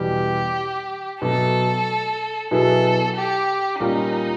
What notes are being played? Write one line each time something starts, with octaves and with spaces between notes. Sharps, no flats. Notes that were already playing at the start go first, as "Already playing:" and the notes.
Already playing: E2 B2 G3 G4
B2 F#3 A3 A4
B2 F#3 B3 E4 G#4 A4
G4
A#2 G3 A#3 C#4 D#4 F4